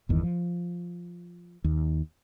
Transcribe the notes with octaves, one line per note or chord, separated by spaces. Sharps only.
G1 E2 D#3
F3
D#2